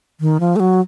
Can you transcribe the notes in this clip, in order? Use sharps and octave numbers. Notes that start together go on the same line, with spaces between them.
D#3
F3
A3
F#3